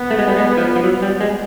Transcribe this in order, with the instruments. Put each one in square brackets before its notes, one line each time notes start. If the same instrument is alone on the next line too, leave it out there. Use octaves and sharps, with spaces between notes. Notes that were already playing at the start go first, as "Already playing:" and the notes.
Already playing: [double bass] B3
[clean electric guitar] A3
G#3
G3
G#3
F3
F3
F#3
G3
G#3